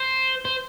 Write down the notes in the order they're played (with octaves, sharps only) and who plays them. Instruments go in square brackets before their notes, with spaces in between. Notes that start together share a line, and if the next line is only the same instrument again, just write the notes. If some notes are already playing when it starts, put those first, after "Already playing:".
Already playing: [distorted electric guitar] C5
C5